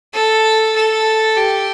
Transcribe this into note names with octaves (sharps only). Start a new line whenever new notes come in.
A4
A4
G4